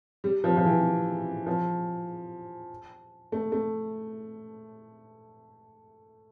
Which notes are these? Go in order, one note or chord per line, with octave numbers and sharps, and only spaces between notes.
G3
F3
F3
E3
F3
A3
A3